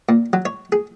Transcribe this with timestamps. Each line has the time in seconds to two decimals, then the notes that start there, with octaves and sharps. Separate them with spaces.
0.09 A#2
0.33 F#3
0.45 C#5
0.72 G#4